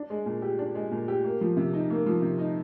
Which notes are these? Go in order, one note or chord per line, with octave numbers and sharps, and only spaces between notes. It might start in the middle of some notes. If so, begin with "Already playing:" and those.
Already playing: D4
G#3
A#2
G4
D4
G#3
A#2
G4
A#3
F3
C3
D#4
A#3
F3
C3
D#4